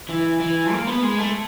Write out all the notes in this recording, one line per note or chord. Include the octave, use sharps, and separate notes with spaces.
E3
E3
A#3
B3
G#3
A3